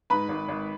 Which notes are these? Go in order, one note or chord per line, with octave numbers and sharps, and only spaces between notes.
G#2 B4 B5
G#1
G#1